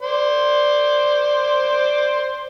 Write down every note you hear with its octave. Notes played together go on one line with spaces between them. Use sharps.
C5 D5 C6